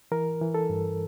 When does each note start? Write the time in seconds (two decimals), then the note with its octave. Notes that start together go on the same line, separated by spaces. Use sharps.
0.12 E3 A#4
0.41 E3
0.54 A4
0.70 G2